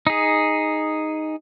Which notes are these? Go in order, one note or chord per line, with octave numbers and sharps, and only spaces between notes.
D#4 G#4